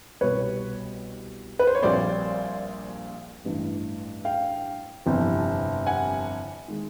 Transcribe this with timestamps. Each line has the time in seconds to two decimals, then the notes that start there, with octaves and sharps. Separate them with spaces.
0.21 C2 B2 G3 B4 C#5
1.59 B4
1.67 C5
1.75 C#5
1.82 A#1 A#2 G3 C4 C5 D5
3.45 A1 G2 E3
4.25 F5 G5
5.06 G1 F2 C3 E3
5.87 F#5 G#5
6.68 D#3 G#3